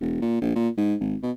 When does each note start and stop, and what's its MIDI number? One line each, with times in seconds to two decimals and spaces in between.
0.01 0.17 28
0.21 0.41 46
0.41 0.53 34
0.55 0.69 46
0.77 0.95 44
1.00 1.16 32
1.22 1.31 47